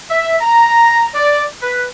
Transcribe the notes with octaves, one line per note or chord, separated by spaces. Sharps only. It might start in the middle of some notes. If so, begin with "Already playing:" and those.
E5
A#5
D5
B4